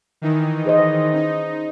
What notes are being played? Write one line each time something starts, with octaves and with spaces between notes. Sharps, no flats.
D#3 E3 D#4
G#4 C5 D#5
C#4 D#4